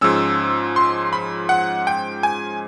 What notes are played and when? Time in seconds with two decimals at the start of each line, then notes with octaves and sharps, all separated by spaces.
0.01 G#2 F3 G#3 C#4 E6
0.76 C6
1.13 B5
1.49 F#5
1.87 G5
2.23 G#5